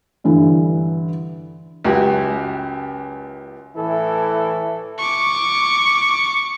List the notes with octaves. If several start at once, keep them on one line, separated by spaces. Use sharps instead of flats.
G2 D3 E3
C#2 F#2 F#4 G4
A2 E3 E4 A4
C#6 D6